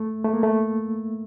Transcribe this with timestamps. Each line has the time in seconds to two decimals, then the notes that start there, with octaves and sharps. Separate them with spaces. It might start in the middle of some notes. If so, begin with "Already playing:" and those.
Already playing: A3
0.24 A3
0.34 A#3
0.43 A3